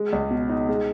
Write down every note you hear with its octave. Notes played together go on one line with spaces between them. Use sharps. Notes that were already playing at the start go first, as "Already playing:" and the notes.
Already playing: G#3
C#2
B2
D#4
G#3